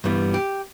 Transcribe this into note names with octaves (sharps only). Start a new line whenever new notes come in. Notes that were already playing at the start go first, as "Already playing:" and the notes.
G2 E3 G3 B3
G4